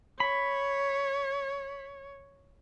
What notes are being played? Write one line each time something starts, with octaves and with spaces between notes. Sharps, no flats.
C#5 B5